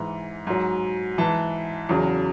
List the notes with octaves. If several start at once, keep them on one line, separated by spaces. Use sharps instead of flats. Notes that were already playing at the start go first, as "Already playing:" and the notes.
Already playing: G#2 E3
G#2 F#3
G#2 E3 A5
E2 C#3 F#3